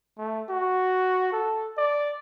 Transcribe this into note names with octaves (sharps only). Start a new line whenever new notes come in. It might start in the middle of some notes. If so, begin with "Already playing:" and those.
A3
F#4
A4
D5